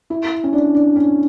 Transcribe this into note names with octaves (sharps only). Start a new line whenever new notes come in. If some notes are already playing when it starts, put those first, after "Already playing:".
E4
C#4
D4
D4
C#4